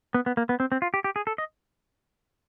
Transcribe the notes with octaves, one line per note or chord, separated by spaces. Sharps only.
B3
B3
A#3
B3
C4
C4
F4
G4
G4
G#4
A4
D#5